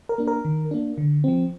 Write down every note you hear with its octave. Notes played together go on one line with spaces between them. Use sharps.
A#4
A#3 D4
A#4
D#3
A#3 D4
D3
F3 C4